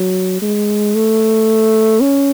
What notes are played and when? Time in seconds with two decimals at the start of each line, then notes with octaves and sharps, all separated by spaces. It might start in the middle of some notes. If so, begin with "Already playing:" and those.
Already playing: F#3
0.42 G#3
0.95 A3
2.02 C#4